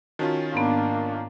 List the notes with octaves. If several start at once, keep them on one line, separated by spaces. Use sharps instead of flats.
D#3 C#4 F4 F#4 A5
G#2 A#3 B3 D4